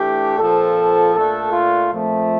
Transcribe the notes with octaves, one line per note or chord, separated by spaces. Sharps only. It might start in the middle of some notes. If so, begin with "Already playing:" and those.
Already playing: E3 A3 D4 G4
A#2 F3 C4 A4
A#2 A3 D4 A4
F4
A#2 F3 A3 C4